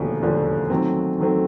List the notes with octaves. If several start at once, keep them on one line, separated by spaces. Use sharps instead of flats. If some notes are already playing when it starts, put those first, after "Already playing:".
Already playing: E1 D#2 D3 F3 A3
E1 D#2 D3 F3 A3
D#3 F#3 A3 C4
D#3 F#3 A3 C4